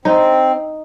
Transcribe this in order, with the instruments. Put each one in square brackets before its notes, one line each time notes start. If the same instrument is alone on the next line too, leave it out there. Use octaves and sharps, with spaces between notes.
[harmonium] C4 [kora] D#4